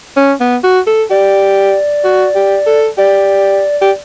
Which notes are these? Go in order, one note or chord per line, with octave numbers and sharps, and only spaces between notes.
C#4
B3
F#4
A4
G4 D5
F#4
G4
A4
G4 D5
G4 D5